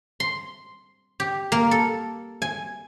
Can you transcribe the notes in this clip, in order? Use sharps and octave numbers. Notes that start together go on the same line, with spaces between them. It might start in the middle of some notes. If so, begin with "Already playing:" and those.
C6
G4
A#3
A4
G#5